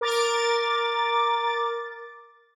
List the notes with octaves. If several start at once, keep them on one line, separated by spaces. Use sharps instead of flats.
A#4 D6 A6